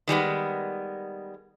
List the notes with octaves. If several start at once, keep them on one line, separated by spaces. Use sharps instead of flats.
D#3 G3 G#3 B3